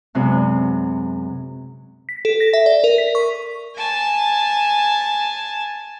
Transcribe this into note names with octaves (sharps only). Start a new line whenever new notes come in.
F#2 C3 G#3 B3 D4
B6
A4
A#6
E5
D5
A#4
B6
C#6
G#5 A5